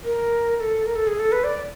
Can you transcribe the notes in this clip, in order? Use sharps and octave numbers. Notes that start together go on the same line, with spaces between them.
A#4
A#4
A4
A#4
A4
G#4
A4
B4
D5
D5